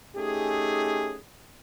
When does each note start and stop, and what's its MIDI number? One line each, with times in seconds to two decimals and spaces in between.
0.16 1.17 57
0.16 1.17 61
0.16 1.17 63
0.16 1.17 67
0.16 1.17 68